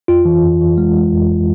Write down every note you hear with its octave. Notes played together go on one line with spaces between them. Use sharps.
F2 F4
E3
F2
E3
G#3
G#3
F2